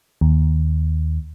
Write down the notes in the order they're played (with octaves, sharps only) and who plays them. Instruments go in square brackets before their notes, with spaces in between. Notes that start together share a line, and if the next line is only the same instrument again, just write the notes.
[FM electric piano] D#2